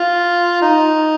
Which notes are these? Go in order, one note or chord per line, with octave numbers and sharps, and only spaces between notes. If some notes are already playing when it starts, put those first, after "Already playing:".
Already playing: F4
D#4